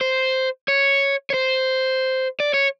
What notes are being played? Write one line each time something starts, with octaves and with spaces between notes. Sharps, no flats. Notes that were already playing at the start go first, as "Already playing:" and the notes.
C5
C#5
C#5
C5
D5
C#5